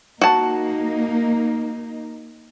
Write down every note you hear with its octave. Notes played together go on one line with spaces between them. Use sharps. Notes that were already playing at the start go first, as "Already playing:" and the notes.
A#3 D#4 F#4 A5